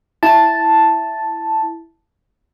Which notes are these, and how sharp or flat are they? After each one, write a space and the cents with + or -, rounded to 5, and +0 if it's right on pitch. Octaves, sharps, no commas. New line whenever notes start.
E4 +0 A5 +0